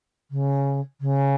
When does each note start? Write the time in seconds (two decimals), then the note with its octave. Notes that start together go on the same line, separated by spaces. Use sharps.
0.31 C#3
1.01 C#3